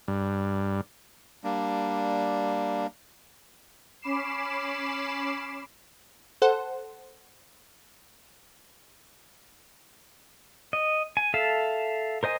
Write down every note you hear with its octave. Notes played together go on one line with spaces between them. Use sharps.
G2
G3 A#3 D4
C#4 B5 D6 C7 E7
A4 C5 F#5
D#5
G#5
A4 E5 F5 A5
A#4 C5 D#5 G#5